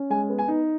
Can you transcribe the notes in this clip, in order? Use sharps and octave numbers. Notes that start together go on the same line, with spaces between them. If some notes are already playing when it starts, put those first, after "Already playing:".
Already playing: C#4
G#3 G#5
B3
G#5
D#4